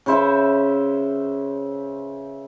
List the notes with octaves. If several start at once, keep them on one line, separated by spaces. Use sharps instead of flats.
C#3 B4 C5 E5